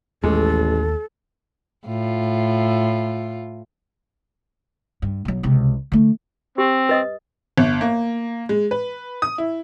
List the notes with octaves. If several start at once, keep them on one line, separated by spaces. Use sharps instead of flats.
A1 D#2 G#3 A4
A2 F4
G2
B1 F#3
C#2 C3
D3 A3
C4 G4
B4 D#5 D#6
G1
A#3
G#3
B4
D#6
E4